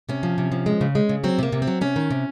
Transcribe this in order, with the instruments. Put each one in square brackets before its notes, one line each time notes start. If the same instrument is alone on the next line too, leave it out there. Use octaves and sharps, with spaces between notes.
[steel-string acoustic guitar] C3 C#4
F3
C3
F3
G#3
C#3
G#3
C#3
F#3 C4
C3 A#3
C3
C4
F#3
C3 C#4
D#3
C3